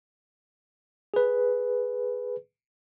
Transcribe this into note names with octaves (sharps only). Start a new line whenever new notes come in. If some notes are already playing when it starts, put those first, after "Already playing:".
G#4 B4